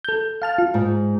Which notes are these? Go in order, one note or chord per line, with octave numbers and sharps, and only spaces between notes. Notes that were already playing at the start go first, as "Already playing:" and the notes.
A4 G6
F5 A5 F6
F4
G#2